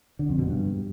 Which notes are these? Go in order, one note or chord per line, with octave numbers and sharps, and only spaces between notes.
D3
F2
B2
G2